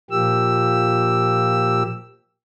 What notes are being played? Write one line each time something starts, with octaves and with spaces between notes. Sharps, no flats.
A#2 F3 A#3 G4 E6